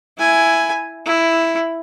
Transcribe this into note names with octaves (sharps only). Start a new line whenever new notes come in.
E4 G#5
E4